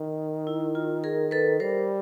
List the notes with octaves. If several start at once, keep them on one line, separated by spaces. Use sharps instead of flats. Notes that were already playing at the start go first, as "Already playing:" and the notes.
Already playing: D#3
E4
F4
G#4 A#4
A4 B4
G3 A#4 C5